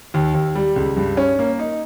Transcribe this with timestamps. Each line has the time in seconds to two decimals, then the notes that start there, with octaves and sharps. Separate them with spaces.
0.14 D#2
0.34 D#2
0.55 G3
0.76 C#2
0.97 G2
1.17 C#4
1.39 A#3
1.59 D#4